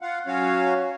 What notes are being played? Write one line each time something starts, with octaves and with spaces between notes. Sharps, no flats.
F4 F5 F#5
F#3 C#4 F#4 C#5 F5